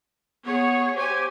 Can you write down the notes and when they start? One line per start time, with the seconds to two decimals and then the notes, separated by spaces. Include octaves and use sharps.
0.46 B3 G#4 C#5
0.96 G4 C5 G#5